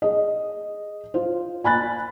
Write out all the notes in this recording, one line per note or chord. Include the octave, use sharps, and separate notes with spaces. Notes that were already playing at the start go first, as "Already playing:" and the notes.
G#4 D#5
F4 C5
G#5 B5 F#6 A6